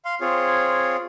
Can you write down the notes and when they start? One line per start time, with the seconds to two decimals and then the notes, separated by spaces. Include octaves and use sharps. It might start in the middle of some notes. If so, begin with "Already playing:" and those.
0.05 F5 C6
0.21 C4 F4 G#4 C#5